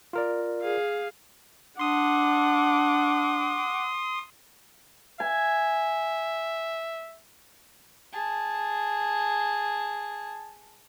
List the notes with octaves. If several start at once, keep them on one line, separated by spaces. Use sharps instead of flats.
F4 A#4 D5
G#4 F5
D4 F#5 C6 D6 D#6
E5 G#5
G#4 A5